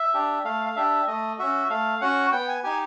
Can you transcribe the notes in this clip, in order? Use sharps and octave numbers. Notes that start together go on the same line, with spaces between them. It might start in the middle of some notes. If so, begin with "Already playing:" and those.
Already playing: E5
D4 G4
A3 F5
F5
D4 G4 E5
A3 D#5
C#4 F#4 E5
A3 F5
C#4 F#4 F#5
B3 G5
G#5
D#4 G4 G#5